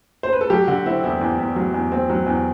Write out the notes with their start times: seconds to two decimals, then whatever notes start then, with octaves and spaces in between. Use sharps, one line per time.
0.23 C5
0.33 B4
0.41 A4
0.50 F#3 G4
0.68 D3 F#4
0.86 C4 E4
1.03 E2 E4
1.21 E2
1.39 E2
1.56 F#3
1.74 E2
1.92 C4
2.10 F#3
2.27 E2